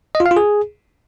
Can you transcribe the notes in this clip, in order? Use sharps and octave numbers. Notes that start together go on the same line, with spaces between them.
D#5
F4
F5
F4
G#4